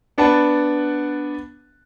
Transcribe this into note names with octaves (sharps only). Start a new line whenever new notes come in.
B3 D4 B4 F#5 A5